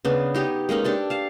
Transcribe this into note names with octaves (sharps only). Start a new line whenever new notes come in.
C#3 B3 D4
D#4 G4 C#5
G#3 A#3 C#4 D#4
D4 G4 A4
F5 A5